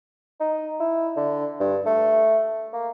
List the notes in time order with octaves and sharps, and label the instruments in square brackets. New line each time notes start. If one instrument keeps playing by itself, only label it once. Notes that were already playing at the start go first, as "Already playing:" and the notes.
[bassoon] D#4
E4
D3
G2
A3
A#3